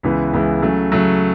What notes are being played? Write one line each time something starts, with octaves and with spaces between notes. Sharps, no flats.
C#2 C#3 E3 B3 E4
C#2 C#3 E3 B3 E4
C#3 F#3 A3
C#3 F#3 A3